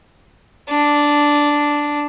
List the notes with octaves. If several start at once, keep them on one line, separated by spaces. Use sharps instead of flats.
D4